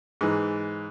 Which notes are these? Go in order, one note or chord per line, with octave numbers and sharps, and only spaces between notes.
G#2 E3